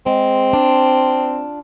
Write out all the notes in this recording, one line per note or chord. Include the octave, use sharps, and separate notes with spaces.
G#3 C4
D4 F4